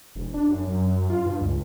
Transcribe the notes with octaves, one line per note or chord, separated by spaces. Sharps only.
E1
D4
F#2
F#2
F4
G2
C#2